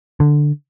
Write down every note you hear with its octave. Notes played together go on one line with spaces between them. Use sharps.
D3